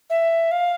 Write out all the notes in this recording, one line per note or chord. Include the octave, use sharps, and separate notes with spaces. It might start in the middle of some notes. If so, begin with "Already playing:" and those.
E5
F5